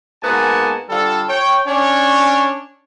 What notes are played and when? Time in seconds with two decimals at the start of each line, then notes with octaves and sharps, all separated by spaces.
0.23 G#2 A#3 B3 F#4 G#5 A5
0.89 D3 G3 F4 A4
1.29 C#5 G5
1.67 C#4 D4 C#5